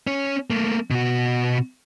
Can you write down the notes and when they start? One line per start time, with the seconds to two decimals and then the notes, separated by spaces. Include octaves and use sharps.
0.07 C#4 C#5
0.50 A3 A#3
0.91 B2 F#4